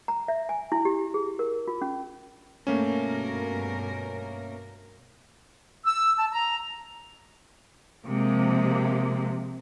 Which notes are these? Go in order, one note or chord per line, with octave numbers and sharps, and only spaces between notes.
A#5
E5
G#5
E4
G4
G#4
A#4
F4
C#4
G2 B2 A3 A#3 C#4 A#4
E6
A5
A#5
C3 F3 G#3 A#3